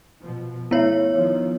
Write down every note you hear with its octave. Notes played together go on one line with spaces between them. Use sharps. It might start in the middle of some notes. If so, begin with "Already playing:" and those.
B2 F3
A3 B3 E4 C#5 E5
D#3 F3